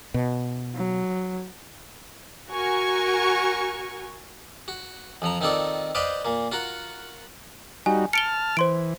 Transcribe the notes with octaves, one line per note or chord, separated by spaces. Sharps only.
B2
F#3
F#4 A#4 G#5 C#6
F#4
F2 F3 A#5
D#3 C4 D#4 F4 A4 D5
B4 C5 D5 D#5 F5 G5
A#2 A#3
F4 F#4 A#4 F#5
G3 D#4 F#4 G#5
A5 F6 C#7 D7 G7
E3 C5 C6 D7